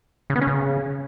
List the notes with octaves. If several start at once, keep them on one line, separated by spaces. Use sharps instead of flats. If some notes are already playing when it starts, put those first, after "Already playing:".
C#3
B3
C#4
C#3